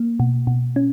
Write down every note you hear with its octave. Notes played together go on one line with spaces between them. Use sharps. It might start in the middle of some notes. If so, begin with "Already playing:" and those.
Already playing: A#3
B2
B2
C#4